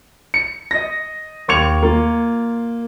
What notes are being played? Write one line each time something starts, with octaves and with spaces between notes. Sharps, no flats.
C#7
D#5 A#6
D#2 C#6 G#6 C#7 F7
A#3 F4